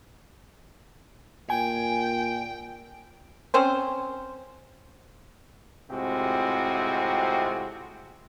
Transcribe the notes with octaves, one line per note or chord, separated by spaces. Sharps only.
A#2 G5 G#5
C4 C#4 C5
A2 C3 G#3 C4 F4 F#4